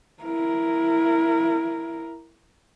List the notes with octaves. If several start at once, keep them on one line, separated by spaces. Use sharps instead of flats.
E4 A#4